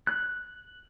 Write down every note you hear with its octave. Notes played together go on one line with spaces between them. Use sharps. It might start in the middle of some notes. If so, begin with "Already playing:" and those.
F#6